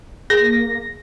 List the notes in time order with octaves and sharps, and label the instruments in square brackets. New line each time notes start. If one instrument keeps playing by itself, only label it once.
[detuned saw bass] A#3 [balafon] G#4 A#4 [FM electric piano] A#6